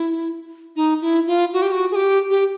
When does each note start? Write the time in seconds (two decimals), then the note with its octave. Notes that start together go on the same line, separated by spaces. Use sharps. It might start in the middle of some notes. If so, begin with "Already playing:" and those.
Already playing: E4
0.76 D#4
1.02 E4
1.27 F4
1.53 F#4
1.62 G4
1.72 F#4
1.91 G#4
1.96 G4
2.30 G4